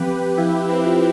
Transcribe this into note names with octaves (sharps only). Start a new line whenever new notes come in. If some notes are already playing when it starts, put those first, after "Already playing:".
Already playing: F3 C4 G4 B4
F3 E4 G4
C4 E4
F4